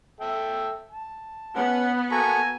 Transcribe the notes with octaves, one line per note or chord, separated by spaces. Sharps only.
A4 E5 G5
A5
B3 C#4 F#5
A#3 F#4 A4 G#5 A#5 C#6